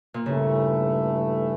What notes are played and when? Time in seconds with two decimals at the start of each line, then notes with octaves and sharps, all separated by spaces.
0.14 A#2
0.26 G2 C#3 E3 A3